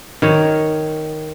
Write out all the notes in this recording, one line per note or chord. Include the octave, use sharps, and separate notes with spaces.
D#3 C#5